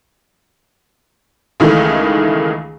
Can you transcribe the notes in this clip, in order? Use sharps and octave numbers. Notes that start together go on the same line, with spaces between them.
C#2 D#3 E3 A3